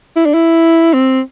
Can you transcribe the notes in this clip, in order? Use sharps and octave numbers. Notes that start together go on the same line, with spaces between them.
E4
D4
E4
C4